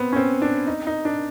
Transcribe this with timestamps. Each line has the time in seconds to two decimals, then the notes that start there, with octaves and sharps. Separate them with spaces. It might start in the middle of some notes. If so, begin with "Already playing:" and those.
Already playing: B3 C4
0.13 C#4
0.16 C4
0.42 D4
0.67 D#4
0.87 D#4
1.05 D4